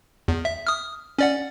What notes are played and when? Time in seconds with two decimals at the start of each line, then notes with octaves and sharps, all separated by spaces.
0.28 E2
0.45 E5
0.67 D#6 F6
1.19 C#4 D5 F#5